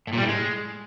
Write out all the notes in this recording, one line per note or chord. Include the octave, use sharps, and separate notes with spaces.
A2
A#2
G3
A2
G#3